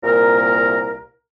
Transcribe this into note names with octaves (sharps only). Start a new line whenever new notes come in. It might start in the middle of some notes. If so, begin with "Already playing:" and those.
C2 A#2 A#4